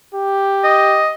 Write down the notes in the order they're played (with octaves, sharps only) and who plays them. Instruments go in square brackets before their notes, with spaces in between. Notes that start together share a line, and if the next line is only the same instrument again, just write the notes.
[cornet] G4
[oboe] D#5